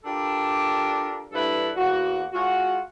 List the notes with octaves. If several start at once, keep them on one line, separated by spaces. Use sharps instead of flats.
D4 F4 G4 A4 A#4
G2 D4 E4 A4 B4
E2 A#3 F#4
G#3 F4 F#4